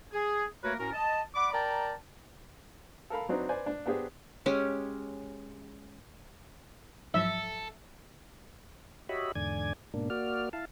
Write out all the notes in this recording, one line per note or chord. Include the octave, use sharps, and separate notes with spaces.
G#4
A3 A#3 F#4 A#4 B4 C#5
A2 C#4 F#4 A#4
D#5 A5
D5 F#5 B5 D6
A#4 D5 G5 A5 A#5
A4 A#4 F5 B5
F#3 C4 D4 D#4 B4
B4 C5 D5 G#5
D4
B3 D4 G4 G#4 C5
G#3 C#4 G4
G#2 F3 F#3 A4 E5
F#4 G4 C#5 D#5 E5 B5
E2 G#2 D3 D5 G#5 G#6
G#2 B2 A#3 D4
A#3 F#4 D5 F6
E4 F5 A5